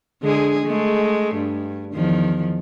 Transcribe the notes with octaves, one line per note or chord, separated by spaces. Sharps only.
D3 G#3 G#4
G#3 A3
G2
E2 D#3 F3